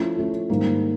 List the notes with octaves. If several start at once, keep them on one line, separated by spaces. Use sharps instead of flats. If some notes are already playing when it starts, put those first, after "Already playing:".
Already playing: F3 A3 C#4 E4
F3 A3 C#4 E4
G#2 D#3 G3 A#3